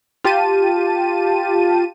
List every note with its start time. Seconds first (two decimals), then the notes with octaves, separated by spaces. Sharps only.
0.24 F4 G4 A5 D#7